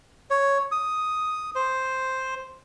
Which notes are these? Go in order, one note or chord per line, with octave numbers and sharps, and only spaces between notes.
C#5
D#6
C5